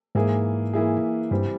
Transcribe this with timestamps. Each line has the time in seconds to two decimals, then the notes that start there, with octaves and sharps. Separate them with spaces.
0.15 G#2 E3 A#3 E4 G#4
0.73 E3 A#3 E4 G#4
1.31 G2 E3 G3 C4